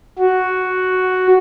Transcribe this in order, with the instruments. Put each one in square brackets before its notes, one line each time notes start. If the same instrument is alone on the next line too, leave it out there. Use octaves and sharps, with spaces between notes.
[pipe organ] F#4